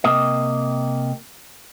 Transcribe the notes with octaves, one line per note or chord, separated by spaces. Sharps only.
C3 A#3 D#5